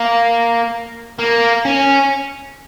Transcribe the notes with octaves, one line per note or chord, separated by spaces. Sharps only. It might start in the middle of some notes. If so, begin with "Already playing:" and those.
Already playing: A#3
A#3
C#4